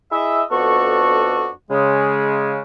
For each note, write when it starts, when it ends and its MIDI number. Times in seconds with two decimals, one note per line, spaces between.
0.12 0.42 64
0.12 0.42 68
0.12 0.42 75
0.12 0.42 76
0.52 1.49 41
0.52 1.49 59
0.52 1.49 62
0.52 1.49 66
0.52 1.49 69
0.52 1.49 85
1.70 2.59 49
1.70 2.59 56